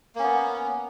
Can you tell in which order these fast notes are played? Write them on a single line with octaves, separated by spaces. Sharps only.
A#3 C#4 B3